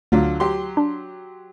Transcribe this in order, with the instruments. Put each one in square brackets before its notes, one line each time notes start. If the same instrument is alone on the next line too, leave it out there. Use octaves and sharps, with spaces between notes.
[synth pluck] D2 [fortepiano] D3 F#3 F4
[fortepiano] F#3 G4 C6
[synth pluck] D4